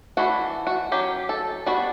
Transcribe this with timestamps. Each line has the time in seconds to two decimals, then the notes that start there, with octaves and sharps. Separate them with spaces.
0.17 E3 A3 D4 F#4
0.67 F#4
0.92 F#3 C#4 G4
1.29 A4
1.66 G3 B3 D4 F#4